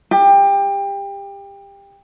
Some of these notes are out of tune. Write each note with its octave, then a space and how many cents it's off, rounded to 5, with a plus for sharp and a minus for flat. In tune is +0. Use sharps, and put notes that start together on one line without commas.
G4 +25